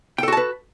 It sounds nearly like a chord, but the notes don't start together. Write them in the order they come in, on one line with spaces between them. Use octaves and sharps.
G5 A4 F#4 A5 B4